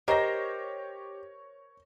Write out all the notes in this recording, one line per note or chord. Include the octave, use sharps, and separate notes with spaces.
G4 A#4 C5 C#5 D#5 A#5 A#6